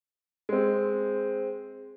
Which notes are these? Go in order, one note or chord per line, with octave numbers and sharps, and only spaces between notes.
G#3 C4